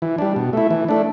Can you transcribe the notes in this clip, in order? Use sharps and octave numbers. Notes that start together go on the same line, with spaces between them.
E3
G3 D4
B2
A3 E4
E3
A3 D4